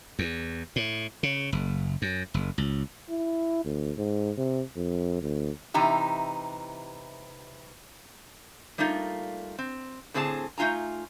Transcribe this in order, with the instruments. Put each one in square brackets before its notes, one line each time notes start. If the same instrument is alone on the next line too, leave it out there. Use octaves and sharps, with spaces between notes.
[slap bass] E2
A2
C#3
F#1
F#2
F#1
C#2
[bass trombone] E4
D2
G#2
C3
F2
D2
[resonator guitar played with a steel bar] C3 E3 D#4 G4
G3 A3 A#3 D#4 F4
C4
A2 D3 C4 G#4 D5 A5
A3 D#4 F4 G#5 A#5